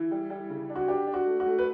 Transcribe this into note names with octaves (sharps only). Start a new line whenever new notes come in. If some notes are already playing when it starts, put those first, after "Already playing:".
Already playing: E3 E4
G3
G3
C#3
D4
F#4
D4 G4
D4
F#4
A3
F#4
A3
B4